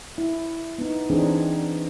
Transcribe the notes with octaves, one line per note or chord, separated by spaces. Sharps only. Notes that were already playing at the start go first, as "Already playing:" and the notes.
E4
B3 D#4
E3 C4 D4 D#4 G#4